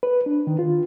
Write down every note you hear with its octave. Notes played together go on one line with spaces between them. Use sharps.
B4
D4
D#3
F4